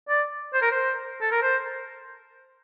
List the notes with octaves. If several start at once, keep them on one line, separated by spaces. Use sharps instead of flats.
D5
C5
A#4
C5
A4
A#4
C5